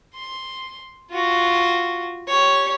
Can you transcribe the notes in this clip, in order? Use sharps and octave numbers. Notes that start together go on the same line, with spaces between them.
C6
F4 F#4
G4 C#5